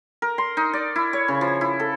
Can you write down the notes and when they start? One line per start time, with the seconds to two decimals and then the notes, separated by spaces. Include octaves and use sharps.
0.22 A#4
0.38 C6
0.57 D#4
0.73 D5
0.96 E4
1.13 C#5
1.28 C#3
1.41 F3
1.61 E4
1.80 A4